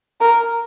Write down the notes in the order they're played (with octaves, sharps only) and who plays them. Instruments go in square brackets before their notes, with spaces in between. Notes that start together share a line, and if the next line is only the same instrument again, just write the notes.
[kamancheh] A#4